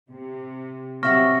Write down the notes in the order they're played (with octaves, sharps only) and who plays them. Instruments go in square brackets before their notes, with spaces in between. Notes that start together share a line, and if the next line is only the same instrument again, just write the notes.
[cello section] C3
[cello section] C3 F#3 [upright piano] C4 E5 F#5 [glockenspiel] C#6 F6 A#6